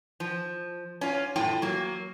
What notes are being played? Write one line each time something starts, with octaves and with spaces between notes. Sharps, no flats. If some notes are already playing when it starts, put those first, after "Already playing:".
F3
C#4 F4
F#2 A2 F4 G5
F#3 A#3